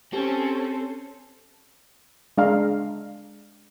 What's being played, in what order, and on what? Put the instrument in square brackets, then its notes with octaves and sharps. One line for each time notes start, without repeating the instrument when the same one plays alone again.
[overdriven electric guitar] C4 [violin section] C#4 [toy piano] D#4 G4 [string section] A4 C5
[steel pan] G#3 D4 F5 A#5